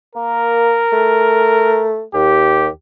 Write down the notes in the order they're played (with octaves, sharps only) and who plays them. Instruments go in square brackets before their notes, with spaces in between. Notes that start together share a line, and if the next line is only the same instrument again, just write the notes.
[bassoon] A#3 [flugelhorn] A#4
[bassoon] A3
[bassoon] D#2 [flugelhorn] G4